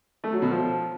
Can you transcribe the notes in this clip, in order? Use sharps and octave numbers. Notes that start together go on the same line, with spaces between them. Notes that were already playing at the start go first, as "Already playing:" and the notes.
A3
F#3
B2
F3